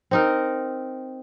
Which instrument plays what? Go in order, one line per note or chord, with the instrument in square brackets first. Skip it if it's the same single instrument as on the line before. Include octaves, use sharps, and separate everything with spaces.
[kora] C4 D#4 A#4